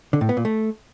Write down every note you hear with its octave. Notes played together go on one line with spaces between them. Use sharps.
D3
A2
B3
A#2
A3